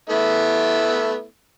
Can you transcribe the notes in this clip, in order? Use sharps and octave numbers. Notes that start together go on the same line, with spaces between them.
A3 B3 E4